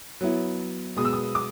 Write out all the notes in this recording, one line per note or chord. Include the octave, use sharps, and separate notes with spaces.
F#3 B3 E4
B2 G#3 B3 D#6
E6
D#6
D6